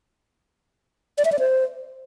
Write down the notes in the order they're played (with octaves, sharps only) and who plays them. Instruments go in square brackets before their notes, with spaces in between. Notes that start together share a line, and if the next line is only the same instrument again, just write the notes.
[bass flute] D5
E5
D5
C5